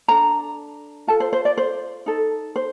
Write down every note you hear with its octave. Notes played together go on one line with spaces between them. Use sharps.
D4 A4 A#5
F4 A4 A5
C5
C5
D5
C5
D#4 A4
C5